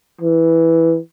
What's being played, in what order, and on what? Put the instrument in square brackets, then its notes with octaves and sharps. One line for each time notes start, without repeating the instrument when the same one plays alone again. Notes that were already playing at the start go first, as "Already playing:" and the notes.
[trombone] E3